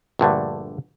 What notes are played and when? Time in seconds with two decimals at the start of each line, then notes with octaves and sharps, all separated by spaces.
0.19 A#1 G2 D3 A3